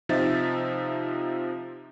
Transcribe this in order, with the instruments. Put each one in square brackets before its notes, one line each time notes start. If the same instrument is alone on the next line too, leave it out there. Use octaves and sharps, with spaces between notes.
[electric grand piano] C3 F3 D#4 E5 A6